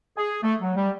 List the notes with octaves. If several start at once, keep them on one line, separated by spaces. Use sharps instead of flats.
G#4
A3
F#3
G3